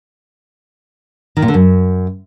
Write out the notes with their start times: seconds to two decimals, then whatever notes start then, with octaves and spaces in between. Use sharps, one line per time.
1.37 D#3
1.42 A#2
1.48 D3
1.54 F#2